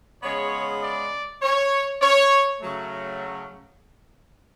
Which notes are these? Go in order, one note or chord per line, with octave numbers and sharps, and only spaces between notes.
C#3 G#3 B3 C#5
D5
C#5
C#5
C#3 F#3 A3